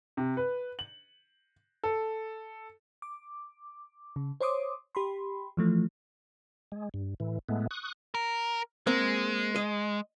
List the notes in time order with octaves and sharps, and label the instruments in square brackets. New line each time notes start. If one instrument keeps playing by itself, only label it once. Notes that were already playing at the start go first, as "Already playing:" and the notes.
[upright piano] C3
B4
F#7
A4
[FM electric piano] D6
C#3
C5 C#5 C6 D6 D#6
G4 B5 C6
E3 F3 A3
[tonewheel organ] G#3
G2
A2 E3
A2 G#3 A3 B3
C#6 D#6 F#6
[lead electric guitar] A#4
[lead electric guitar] G#3 [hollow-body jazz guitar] A#3 C4
[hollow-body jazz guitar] D#5